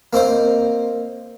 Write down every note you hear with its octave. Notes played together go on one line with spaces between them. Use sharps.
A#3 C4 D#4 C5